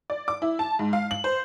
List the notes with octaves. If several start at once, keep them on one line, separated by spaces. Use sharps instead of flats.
D5
D6
E4
A5
G#2
F5
F#7
C5